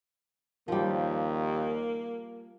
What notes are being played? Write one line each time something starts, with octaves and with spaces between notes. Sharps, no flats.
D#2 F3 G3 A#3